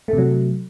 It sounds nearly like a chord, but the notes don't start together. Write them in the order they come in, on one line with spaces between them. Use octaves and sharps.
A3 C3 F#3